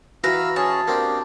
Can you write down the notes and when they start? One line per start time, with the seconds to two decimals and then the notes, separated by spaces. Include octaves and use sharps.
0.24 E3 F#4 B4 F5 A#5 E6
0.56 C#4 G#4 C#5 A5
0.88 A#3 C4 D4 G4